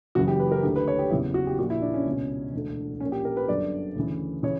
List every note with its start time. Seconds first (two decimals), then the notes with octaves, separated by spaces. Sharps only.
0.15 F#1 F#2 C#3 E3 F#4
0.28 G4
0.40 B4
0.52 A#4
0.63 D3 G4
0.66 D2
0.76 B4
0.88 C#5
0.99 G4
1.10 F#1 E2 C#3 E3 E4
1.34 F#4
1.47 G4
1.59 A#1 A#2 F#4
1.70 E4
1.82 D4
1.94 C#4
2.06 C#2 B2
2.53 E1 D2 D3
3.00 A#1 A#2 C#4
3.12 G4
3.25 A#4
3.37 B4
3.48 G1 F#2 D3 D5
3.96 D2 C#3 E3
4.43 C#3 E3 C#5